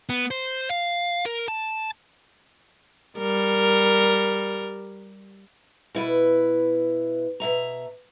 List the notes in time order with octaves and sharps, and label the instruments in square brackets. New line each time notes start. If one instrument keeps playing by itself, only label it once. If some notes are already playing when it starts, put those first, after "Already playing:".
[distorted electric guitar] B3
C5
F5
A#4
A5
[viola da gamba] G3 A#4
[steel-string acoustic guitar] B2 E4 B4
B2 E5 A#5